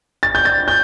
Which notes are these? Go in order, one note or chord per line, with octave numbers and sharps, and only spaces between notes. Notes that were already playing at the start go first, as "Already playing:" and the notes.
A6
G6
A6
G6